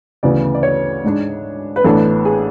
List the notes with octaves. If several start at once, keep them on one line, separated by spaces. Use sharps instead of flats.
D2 C#3 E3 B3 D5
D5
C#5
G#2 G#3 D4
B4
A1 A2 E3 B3 D4 A4
G#4